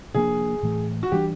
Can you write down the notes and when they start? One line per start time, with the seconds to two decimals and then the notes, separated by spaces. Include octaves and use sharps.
0.14 C3 F3 A#3 D4 G#4
0.62 A2 E3 A3
1.03 F#4
1.12 E3 G3 B3 D4 G4